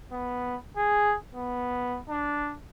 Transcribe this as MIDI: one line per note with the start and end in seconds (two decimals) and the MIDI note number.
0.12 0.56 59
0.77 1.15 68
1.35 1.99 59
2.09 2.55 62